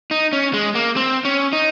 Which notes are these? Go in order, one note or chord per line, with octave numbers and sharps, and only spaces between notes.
D#4
C#4
G#3
A#3
C4
C#4
D#4